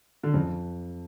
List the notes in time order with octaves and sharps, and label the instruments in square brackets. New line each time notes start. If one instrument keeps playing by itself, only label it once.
[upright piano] D3
[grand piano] F2 [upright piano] C#3